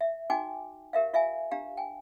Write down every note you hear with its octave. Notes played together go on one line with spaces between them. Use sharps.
E5
D#4 F#4 G5 G#5 D6
G4 A#4 E5 F5
F4 E5 F5 G#5
D4 G4 F5 A#5
G5 G#5